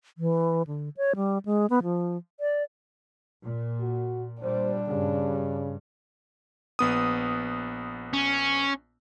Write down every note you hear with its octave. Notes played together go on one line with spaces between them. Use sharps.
E3
D3
C#5
G3
G#3
B3
F3
D5
A#2
F#4
A#2 G3 D4 C5
G2 C#3
A#1 B3 D#6
C#4